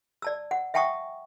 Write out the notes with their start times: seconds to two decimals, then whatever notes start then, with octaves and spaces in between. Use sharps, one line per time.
0.22 D5 A5 E6
0.51 F#5
0.74 E5 F#5 G5 A5 C#6 D#6